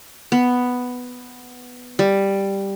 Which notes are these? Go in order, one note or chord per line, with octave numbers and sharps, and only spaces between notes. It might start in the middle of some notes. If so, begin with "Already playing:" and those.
B3
G3